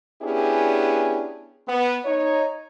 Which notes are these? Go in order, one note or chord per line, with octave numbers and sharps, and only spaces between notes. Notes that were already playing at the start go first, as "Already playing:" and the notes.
B3 C#4 D4 E4 G4 G#4
B3
D#4 C#5